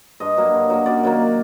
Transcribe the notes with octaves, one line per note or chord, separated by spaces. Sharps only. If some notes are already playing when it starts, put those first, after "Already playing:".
G2 D#5
F#3 A#3
G2
F#3 A#3
F#2 D5
D#3 F#3 A#3